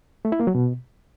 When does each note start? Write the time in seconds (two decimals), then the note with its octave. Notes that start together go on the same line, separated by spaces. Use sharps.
0.25 A3
0.32 E4
0.40 A#3
0.47 F#3
0.55 B2